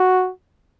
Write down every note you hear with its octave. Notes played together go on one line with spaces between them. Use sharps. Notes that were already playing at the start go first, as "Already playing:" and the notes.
Already playing: F#4